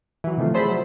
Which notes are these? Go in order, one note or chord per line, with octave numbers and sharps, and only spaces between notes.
E3 F#3
C3 D#3 F3 A3 F4
G#4 A4 C5 D5 E5 B5
F#3